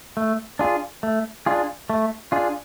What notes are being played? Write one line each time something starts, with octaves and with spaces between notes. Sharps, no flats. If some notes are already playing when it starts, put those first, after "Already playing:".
A3
D4 F4 G#4
A3
D4 F4 G#4
A3
D4 F4 G#4